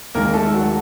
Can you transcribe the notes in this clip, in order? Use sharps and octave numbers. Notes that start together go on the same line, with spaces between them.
D#2 D#3 G#3 A#3 A#4
A3 A4
F#3 F#4